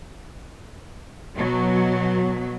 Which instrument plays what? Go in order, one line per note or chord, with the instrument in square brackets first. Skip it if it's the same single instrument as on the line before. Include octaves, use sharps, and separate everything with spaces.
[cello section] B2 F#3